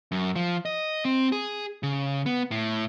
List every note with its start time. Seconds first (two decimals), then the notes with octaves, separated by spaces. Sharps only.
0.12 F#2
0.36 F3
0.65 D#5
1.05 C4
1.32 G#4
1.83 C#3
2.26 B3
2.51 A2